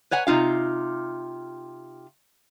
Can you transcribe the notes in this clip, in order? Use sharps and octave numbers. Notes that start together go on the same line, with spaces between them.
B4 C#5 F#5 G#5
C3 D#4 F4 F5